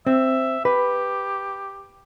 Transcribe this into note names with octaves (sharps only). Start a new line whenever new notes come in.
C4 E5
G4 B4